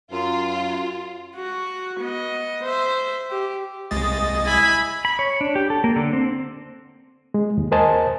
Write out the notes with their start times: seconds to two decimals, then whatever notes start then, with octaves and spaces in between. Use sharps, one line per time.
0.12 F#2 F4
1.36 F#4
2.01 B3 D#5
2.63 C5 E5
3.30 G4
3.91 C2 G#3 D#5 A6
4.46 E4 G#5 B5
5.05 B5
5.19 C#5
5.41 D4
5.56 G4
5.70 A4
5.84 A#3
5.96 D3
6.13 C4
7.34 G#3
7.58 D#2
7.72 A#4 C5 D#5 G#5 A5